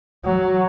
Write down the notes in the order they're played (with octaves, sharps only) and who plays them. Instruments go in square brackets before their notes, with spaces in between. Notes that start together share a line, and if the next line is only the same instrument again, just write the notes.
[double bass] F#3